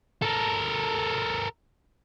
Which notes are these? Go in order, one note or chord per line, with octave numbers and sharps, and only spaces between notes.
A4 A#4